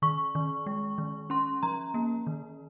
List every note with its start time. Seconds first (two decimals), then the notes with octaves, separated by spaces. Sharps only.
0.02 D#3 C#6
0.35 D#3
0.66 G#3
0.98 D#3
1.30 C#4 C6
1.63 F3 A#5
1.94 A#3
2.27 D#3